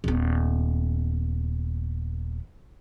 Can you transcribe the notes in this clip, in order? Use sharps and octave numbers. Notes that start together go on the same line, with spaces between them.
D#1 B3